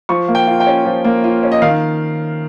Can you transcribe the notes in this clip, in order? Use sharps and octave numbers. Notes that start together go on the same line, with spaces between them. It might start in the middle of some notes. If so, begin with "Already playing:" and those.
F3 C#6
A#3
G5
F4
G5
C#4
F3
A#3
F4
C#4
D#5
D#3 F5